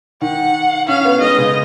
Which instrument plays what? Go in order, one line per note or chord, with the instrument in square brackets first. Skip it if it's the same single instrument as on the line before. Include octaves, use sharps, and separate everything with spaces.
[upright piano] D#3 [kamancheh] F#5
[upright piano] C#4 [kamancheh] F5
[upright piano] B3
[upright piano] G#3 [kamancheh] D#5
[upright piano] C#3